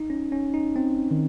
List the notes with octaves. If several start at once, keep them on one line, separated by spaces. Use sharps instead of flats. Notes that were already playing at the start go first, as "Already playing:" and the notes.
Already playing: D#4
C#4
C#4
D#4
C4
D#3